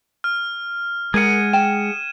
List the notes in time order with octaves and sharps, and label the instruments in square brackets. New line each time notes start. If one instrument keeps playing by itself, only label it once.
[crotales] F6
[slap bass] G#3 [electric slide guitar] G#4 F#5 [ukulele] A#4 [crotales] G#6 D#7
[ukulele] G5 [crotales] E7